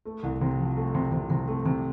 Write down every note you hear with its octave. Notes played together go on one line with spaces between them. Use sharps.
A3
C2
C3
F3
A3
C3
C3
C3
A3
C3